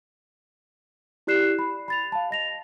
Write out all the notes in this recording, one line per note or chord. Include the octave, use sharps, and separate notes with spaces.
E4 G4 D5 F#6 C7 E7
B5
B5 A6 F7
F5 A5
D#5 A#6 F7